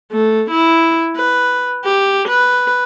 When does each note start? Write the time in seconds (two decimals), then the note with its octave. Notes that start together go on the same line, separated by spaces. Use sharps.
0.12 A3
0.51 E4
1.16 B4
1.84 G4
2.28 B4